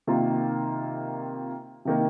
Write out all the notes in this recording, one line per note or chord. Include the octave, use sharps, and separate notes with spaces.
C3 D#3 A#3 F4
C3 D#3 A#3